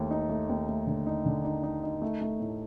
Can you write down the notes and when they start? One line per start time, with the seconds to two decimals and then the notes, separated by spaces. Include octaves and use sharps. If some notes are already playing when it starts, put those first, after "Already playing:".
Already playing: D#2 A3
0.11 D#4
0.29 A3
0.49 D#2
0.69 A3
0.87 D3
1.07 D#4
1.26 D3
1.45 D#4
1.63 D#4
1.83 D#4
2.02 A3
2.21 A3
2.40 A2